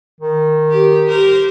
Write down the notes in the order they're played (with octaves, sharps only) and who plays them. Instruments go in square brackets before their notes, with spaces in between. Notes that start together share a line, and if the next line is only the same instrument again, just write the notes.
[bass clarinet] D#3
[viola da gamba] G4
G4 A#4 C5